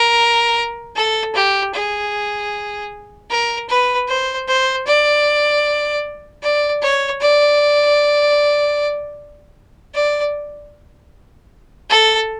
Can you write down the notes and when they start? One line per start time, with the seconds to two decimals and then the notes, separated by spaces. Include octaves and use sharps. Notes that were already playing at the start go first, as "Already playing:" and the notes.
Already playing: A#4
0.96 A4
1.35 G4
1.74 G#4
3.30 A#4
3.69 B4
4.08 C5
4.48 C5
4.86 D5
6.43 D5
6.82 C#5
7.21 D5
9.94 D5
11.90 A4